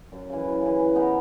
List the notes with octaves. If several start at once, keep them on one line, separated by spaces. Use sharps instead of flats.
F#2
C#3 E3
F#2
C#3 E3
E3
B3 D#4 A#4